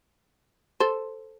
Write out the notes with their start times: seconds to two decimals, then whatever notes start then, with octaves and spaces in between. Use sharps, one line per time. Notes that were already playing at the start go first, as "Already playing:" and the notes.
0.80 A4 C5